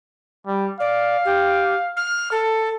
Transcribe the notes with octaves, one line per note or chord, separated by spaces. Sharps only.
G3
D5 F5
G4
F6
A4